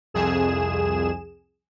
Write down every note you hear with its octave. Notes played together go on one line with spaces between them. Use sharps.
C2 F2 G#4 E7